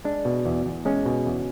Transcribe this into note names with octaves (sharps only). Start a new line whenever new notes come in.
G#3 D4
B2
E2
E2
G#3 C#4
B2
E2